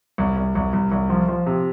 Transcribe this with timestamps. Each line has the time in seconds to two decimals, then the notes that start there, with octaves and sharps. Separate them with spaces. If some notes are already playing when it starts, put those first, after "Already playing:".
0.18 C2
0.37 C2
0.55 C2
0.73 C2
0.92 C2
1.10 F3
1.28 F3
1.46 C3